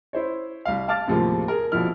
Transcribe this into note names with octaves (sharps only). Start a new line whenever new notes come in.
E4 C5 C#5
C2 F5
F5 A5 D6 F6 A6
D#2 A2 C3 F3 G#3 A#3
G#4 A#4
A#1 B2 F3 E4 F6